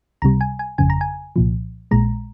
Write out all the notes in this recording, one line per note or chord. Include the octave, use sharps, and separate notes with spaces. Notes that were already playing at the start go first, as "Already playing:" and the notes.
C#2 C3 G3 A#5
G#5
G#5
G1 F2 C#3 G#5
A#5
G#5
C2 A#2 F3
A#1 A#2 G#3 A#5